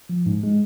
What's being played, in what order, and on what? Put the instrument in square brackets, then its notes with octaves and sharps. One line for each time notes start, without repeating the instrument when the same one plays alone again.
[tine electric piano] F3
G#2
G#3